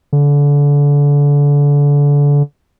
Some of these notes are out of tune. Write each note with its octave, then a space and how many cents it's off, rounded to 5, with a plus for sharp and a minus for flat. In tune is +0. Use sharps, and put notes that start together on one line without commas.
D3 -30